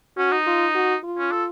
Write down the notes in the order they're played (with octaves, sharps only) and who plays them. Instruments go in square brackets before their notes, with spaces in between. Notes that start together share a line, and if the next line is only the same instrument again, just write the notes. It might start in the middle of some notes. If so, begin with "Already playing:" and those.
[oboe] C#4 [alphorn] F#4
[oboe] D#4
[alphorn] F4
F#4
F4
[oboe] C#4
A4